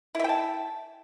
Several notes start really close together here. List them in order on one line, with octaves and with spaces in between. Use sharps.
E4 E5 G5 A5